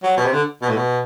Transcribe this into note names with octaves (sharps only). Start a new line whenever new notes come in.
F#3
B2
C3
D3
B2
A2
B2